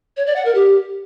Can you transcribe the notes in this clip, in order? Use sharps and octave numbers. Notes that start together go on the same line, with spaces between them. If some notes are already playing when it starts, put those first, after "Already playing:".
C#5
D5
F#5
A#4
G4